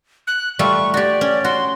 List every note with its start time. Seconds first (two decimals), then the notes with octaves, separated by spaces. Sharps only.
0.27 F#6
0.59 G3 A3 F4 C#6
0.94 F#4 G4 D5
1.21 C#4
1.44 F#4 C6